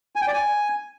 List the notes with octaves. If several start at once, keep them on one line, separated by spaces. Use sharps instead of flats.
G#5
G5
D5
G#5